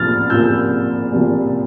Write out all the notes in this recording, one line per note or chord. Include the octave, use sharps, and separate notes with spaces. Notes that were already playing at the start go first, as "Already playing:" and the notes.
Already playing: C2 A#2 F3 F6 A6
C2 A#2 F3 E6 G6
C2 A#2 F3